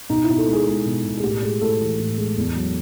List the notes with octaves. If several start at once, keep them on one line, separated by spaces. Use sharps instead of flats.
B2 D#4
E4
B2
A4
G#3 G#4
G#3
B2
B2
G#4
A2 G4
G#3 G#4
A2 A4
E3
A2
G#3
E2
F#3